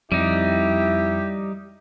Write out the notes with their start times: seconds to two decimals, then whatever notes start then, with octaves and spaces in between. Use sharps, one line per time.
0.12 F2 G3 D#4 E4 G4